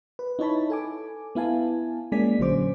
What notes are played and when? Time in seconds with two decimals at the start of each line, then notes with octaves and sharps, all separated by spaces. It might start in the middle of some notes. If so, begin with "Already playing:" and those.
0.19 B4
0.39 D#4 E4 C#5 A5 B5
0.70 A4 G#5 D6
1.35 B3 E4 F5 G#5 A5
2.12 G#3 A#3 C#4 D5 G#5 B6
2.39 A#1 D3 F#3 C#4 C5 D6